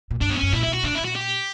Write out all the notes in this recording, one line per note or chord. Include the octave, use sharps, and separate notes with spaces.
A#2
G2 D4
F#2 B3
C#4
F#2
A#2 E4
E4
B2
F#4
A#2 D4
G2 E4
A#2 F#4
G4